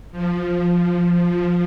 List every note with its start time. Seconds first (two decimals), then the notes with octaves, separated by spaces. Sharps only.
0.12 F3